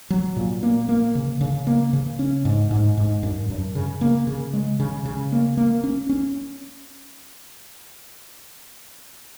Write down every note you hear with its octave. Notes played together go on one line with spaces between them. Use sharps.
F#3
A#2
A#3
A#3
C#3
C#3
A#3
C#3
C#4
G#2
G#2
G#2
F#2
F#2
C#3
A#3
C#3
G#3
C#3
C#3
A#3
A#3
C#4
C#4